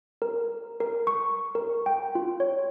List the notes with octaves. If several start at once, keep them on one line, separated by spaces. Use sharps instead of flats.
A#4
A#4
C#6
A#4
G5
F4
C#5